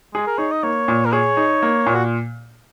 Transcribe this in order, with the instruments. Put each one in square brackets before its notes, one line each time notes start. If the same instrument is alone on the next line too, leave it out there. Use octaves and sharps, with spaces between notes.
[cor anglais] G#3 [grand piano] G#4
[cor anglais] A#4
[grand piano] D#4 [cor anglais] C#5
[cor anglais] D#5
[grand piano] A#3 [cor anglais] C#5
[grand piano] A#2
[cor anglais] A#4
[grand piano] G#4 [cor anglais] C#5
[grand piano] D#4
A#3
A#2
[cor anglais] F#4